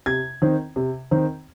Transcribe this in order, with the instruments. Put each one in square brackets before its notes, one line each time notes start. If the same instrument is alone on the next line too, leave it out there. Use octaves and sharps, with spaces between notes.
[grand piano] C3 G#6
D#3 C4 D#4
C3
D#3 C4 D#4